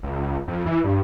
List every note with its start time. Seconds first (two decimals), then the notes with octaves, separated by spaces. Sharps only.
0.03 C#2
0.48 F2
0.66 E3
0.84 G2